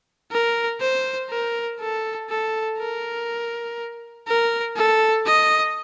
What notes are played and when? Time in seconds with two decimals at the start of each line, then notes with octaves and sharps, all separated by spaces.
0.32 A#4
0.81 C5
1.30 A#4
1.80 A4
2.30 A4
2.79 A#4
4.28 A#4
4.76 A4
5.27 D#5